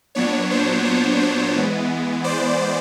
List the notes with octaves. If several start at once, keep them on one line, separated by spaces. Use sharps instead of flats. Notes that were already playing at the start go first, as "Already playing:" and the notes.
A#2 F#3 B3 D4 C#5
C5
C#5
C5
E3 G#3 B3
C5 D5